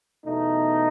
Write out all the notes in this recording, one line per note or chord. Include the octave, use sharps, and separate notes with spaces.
E2 B2 A3 D#4